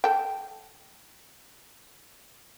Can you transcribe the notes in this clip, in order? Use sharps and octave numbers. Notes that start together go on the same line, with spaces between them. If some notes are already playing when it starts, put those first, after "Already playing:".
A4 G5